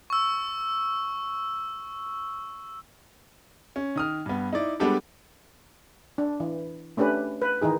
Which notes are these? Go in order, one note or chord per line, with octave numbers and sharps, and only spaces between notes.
C#6 E6
C#4
D#3 D#6 F6
G2 B3
D#4 E4 D5
G3 G#3 B3 D4 G4 A4
D4
E3
A3 C#4 D4 G4 B4
B4
D#3 E3 D#4 G#4